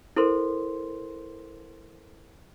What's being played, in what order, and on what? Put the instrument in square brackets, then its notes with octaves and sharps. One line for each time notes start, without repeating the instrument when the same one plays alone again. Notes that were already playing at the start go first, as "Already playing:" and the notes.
[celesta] E4 A4 A#4 C5 C6